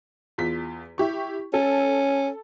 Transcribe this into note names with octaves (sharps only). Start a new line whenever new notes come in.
E2 F4 B6
E4 G4 C#6
C#4 A4